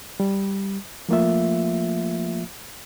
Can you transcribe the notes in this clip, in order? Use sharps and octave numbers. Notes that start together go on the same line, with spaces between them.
G3
F3 A3 A#3 F4 E5